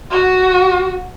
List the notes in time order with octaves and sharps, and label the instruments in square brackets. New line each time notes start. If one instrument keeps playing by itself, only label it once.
[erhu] F#4